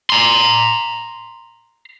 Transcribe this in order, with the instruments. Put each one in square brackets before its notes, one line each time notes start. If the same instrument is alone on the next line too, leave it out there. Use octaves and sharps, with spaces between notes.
[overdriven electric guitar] A#5 C6